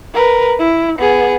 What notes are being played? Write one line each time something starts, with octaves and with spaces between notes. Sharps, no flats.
A#4 B4
E4
B3 G#4